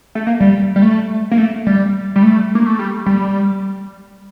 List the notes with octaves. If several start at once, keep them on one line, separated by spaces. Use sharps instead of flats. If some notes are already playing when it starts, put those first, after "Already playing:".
A3
A#3
G3
G3
A3
A#3
A3
G3
G3
A3
A#3
A3
G3
G3